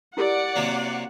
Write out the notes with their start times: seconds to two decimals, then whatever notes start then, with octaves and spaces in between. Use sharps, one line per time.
0.17 E4 G4 A#4 D5 F#5
0.56 C3 F#3 A#3